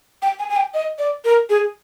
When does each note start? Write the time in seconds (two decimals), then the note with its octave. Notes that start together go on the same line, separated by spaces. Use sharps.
0.22 G5
0.39 G#5
0.49 G#5
0.56 G5
0.74 D#5
0.98 D5
1.24 A#4
1.49 G#4